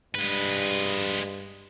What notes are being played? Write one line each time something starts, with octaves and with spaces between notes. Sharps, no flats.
G2 G#3 B4